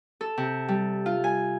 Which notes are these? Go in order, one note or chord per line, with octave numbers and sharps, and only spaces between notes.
A4
C3
G3
F4
G#5